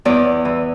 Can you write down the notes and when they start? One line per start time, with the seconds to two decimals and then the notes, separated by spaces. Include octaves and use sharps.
0.05 E2 D5
0.45 E3